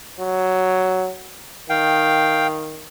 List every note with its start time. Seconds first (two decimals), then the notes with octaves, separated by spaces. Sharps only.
0.20 F#3
1.69 D#3 F5 G5